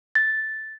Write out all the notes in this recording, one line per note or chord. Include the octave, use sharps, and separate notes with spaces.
A6